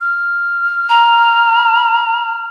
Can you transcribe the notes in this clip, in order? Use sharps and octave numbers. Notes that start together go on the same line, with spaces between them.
F6
A#5